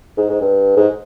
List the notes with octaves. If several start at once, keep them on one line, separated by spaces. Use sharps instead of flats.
G#2
G#2
G2
G#2